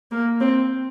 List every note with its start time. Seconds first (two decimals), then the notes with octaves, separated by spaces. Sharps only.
0.12 A#3
0.41 C4